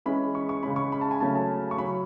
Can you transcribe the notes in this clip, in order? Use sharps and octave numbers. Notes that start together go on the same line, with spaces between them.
E3 G#3 C#4 B5
C#6
C#6
C#3 G#3 C#4 B5
C#6
B5
A5
G#5
C#3 F#3 A3 C#4 A5
A5
C#6
C#3 F#3 C#4 B5